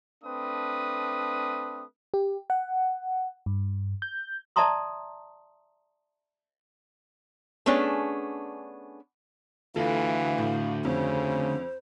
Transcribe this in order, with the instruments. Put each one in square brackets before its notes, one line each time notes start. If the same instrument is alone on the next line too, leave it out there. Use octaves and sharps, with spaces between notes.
[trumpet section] A3 C4 D4 B4 D#6
[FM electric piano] G4
F#5
G2
G6
[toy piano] D5 E5 A5 A#5 C6 D#6
[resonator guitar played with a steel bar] A3 B3 C#4 D4 G#4
[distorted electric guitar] D2 [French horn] E3 [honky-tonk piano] F4 A4 [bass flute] F5
[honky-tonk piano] A2
[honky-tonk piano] F2 [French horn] C#3 [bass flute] C5